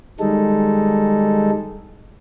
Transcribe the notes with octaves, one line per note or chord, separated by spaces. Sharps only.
D#3 G3 G#3 D#4 A4